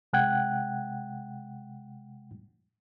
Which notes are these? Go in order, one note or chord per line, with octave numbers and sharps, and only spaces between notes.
C3 G#3 F#5 G5 F#6 G#6